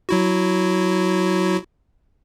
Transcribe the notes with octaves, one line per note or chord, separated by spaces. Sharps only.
F#3 E4 F#4